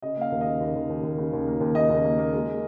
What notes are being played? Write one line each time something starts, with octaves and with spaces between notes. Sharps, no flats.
C#3 D#5
A#3 F5
D#2
D#5
C#3
D#2
D#2
D#2
D#2
C#3
D#2
A#3
D#2
C#3 D#5
D#2
A#3
A#3
G#3